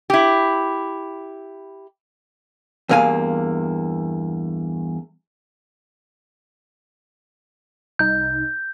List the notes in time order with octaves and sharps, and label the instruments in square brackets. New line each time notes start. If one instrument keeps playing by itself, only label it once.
[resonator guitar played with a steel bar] E4 G4
[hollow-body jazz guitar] E2 G2 A#3 F5 G#5
[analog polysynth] C2 D#4 [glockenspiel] G6